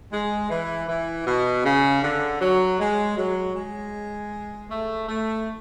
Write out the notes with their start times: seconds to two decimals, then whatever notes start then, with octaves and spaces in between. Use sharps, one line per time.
0.12 G#3
0.50 E3
0.88 E3
1.26 B2
1.64 C#3
2.02 D3
2.40 F#3
2.79 G#3
3.17 F#3
3.55 G#3
4.69 A3
5.08 A3